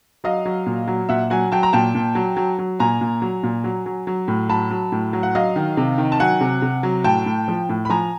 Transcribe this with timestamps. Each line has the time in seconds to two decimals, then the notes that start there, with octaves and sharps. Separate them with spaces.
0.24 F#3 D#5 F5
0.45 F#3
0.66 A#2
0.87 F#3
1.09 A#2 E5 F#5
1.30 F#3 F#5 G#5
1.52 F#3 G5 A5
1.63 A#5
1.73 A#2 G5 A5
1.95 A#2
2.15 F#3
2.36 F#3
2.59 F#3
2.79 A#2 G#5 A#5
3.01 A#2
3.22 F#3
3.43 A#2
3.64 F#3
3.86 F#3
4.07 F#3
4.28 A2
4.49 F#3 A5 B5
4.71 F#3
4.92 A2
5.13 F#3
5.23 F#5
5.35 F#3 D#5 F5
5.56 D#3
5.77 C3
5.98 D#3
6.12 A5
6.20 F#3 F#5 G#5
6.41 C3
6.62 C3
6.83 F#3
7.04 A2 G5 A5
7.26 A2
7.48 F3
7.69 A2
7.85 B5
7.89 F3 G#5 A#5